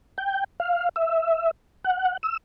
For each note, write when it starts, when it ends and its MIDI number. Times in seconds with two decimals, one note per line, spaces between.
0.18 0.44 79
0.60 0.89 77
0.96 1.51 76
1.84 2.17 78
2.23 2.37 88